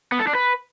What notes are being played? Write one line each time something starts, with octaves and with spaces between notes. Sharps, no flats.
B3
A4
D4
B4